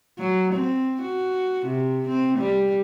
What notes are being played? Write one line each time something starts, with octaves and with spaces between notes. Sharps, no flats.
F#3
C4
F#4
C3
C4
G3